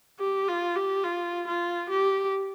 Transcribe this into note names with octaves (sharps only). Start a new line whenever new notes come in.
G4
F4
G4
F4
F4
G4